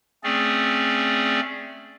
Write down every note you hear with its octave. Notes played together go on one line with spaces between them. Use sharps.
A3 C4 C#4 G#4 D5